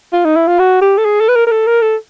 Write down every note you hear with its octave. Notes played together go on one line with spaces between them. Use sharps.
F4
D#4
E4
F4
F#4
G4
A4
G#4
A4
B4
A#4
A#4
A4
A#4
A4